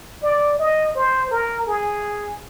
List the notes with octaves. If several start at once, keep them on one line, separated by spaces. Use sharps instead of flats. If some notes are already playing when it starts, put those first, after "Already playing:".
D5
D#5
C5
A#4
G#4